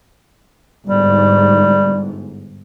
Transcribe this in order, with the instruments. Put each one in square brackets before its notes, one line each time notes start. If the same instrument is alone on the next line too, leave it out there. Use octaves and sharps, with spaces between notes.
[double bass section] G1 G#2 [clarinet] G3